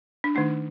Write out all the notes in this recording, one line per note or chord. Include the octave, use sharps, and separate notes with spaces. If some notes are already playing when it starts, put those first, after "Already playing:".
D4
D#3 A3 D4 D#4